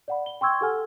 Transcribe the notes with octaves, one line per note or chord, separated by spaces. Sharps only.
D5 F#5 B5
G7
G5 C6 C#6 E6 G#6
G4 A4 F#5 G#5 F6